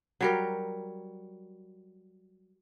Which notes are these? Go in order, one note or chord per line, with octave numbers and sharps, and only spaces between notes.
F#3 G3 A#4